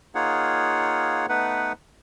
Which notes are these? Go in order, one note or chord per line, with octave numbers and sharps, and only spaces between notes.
A#3 D#4 F4 G#4 C#5 F#5
A3 B3 D#4 B4 F#5